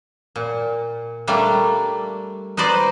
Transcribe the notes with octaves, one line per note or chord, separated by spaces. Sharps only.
A#2
G3 A3 A#3 D4
D#4 B4 C5 D5 D#5